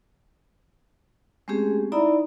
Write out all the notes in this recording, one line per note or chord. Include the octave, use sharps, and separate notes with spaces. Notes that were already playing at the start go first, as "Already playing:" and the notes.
G#3 A3 C4 C#4 G4 G#4
D#4 E4 D5 E5 A#5 B5